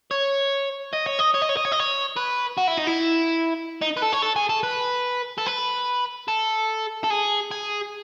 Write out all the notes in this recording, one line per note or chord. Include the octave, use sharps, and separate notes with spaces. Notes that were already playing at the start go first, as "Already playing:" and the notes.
C#5
D#5
C#5
D#5
C#5
D#5
C#5
D#5
C#5
D#5
C#5
B4
F#4
E4
D#4
E4
D#4
B4
A4
C#5
A4
G#4
A4
B4
A4
B4
A4
A4
G#4
G#4